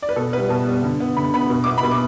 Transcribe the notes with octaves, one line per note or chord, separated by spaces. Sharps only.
D5
B4
B2 A4
G3 B3 B4
B2 A5
G3 B3
D3
B3
D3 B5
B3 B5
B2
B3 D6
B5
B2
D6